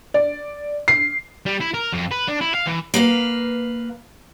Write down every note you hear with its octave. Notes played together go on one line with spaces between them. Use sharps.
D5
C7
G3
E4
A#4
F2
B4
D4
E4
F5
E3
A#3 B4 F5